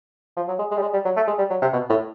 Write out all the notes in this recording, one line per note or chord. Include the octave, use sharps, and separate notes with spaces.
F3
F#3
G#3
G#3
G3
G#3
G3
F#3
A3
G#3
G3
F#3
C3
B2
A2